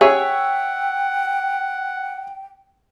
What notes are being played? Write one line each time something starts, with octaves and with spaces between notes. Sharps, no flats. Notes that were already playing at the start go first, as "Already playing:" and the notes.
G#4 C#5 E5 F#5 G5